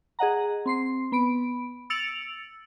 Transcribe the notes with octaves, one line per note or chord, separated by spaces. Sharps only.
G#4 D#5 F#5 A#5
C4 C6 C7
B3 B5 D7
E6 A6 C#7 D7 F7 F#7